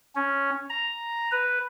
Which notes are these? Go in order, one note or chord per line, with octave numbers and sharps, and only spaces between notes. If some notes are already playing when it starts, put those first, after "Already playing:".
C#4
A#5
B4